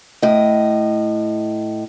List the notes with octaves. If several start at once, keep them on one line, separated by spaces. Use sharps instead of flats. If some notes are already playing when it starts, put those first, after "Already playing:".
A2 D#5